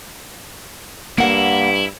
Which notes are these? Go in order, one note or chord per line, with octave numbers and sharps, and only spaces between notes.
G2 A#3 E4 F#5